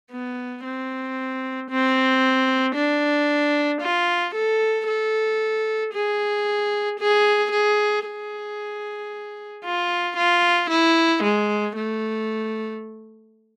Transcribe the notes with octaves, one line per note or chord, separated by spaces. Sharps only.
B3
C4
C4
D4
F4
A4
A4
G#4
G#4
G#4
G#4
F4
F4
E4
G#3
A3